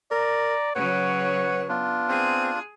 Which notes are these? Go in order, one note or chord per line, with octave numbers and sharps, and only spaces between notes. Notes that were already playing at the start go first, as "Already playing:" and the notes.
A#4 D5 A#5
C#3 F#3 B4 C#5 F#5
B3 D4 F4
C4 G#4